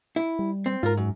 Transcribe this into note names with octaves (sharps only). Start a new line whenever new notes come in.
E4
G3
C4
G#2 F4 A#4
F#2